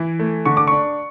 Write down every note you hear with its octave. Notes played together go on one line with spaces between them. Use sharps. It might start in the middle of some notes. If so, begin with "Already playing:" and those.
Already playing: E3 E4
A3
D3 C#6
D6
D4 C#6